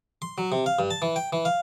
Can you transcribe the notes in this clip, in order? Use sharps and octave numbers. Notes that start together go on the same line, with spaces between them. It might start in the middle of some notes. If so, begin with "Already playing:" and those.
C6
F#3
C3
F5
G2
A5
E3
G5
E3
F5